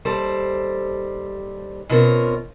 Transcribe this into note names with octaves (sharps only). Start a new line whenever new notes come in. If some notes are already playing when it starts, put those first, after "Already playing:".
D#2 G3 A4 C5
B2 C4 C#4 F4 A#4